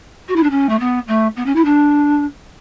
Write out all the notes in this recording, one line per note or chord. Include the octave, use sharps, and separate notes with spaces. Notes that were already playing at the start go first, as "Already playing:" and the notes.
F#4
E4
D4
C#4
A3
B3
A3
B3
C#4
E4
D4